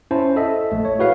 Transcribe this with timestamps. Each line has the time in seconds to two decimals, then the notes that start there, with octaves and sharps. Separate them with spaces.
0.11 C#4 E4 C5 A5
0.36 A4 D#5 E5 A5
0.72 A#1 A3
0.85 C#5
0.99 E4 F#4 G#4 B4 C#5 F5